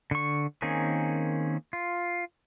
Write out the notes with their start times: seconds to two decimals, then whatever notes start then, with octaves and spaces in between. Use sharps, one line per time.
0.11 D3 C#6
0.62 D#3 A#3 C4 C#4 G#4
1.73 F4